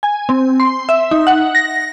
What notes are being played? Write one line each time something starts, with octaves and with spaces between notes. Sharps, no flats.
G#5
C4
C6
E5
D#4
F#5
A#6